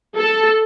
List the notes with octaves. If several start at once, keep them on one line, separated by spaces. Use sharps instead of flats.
A4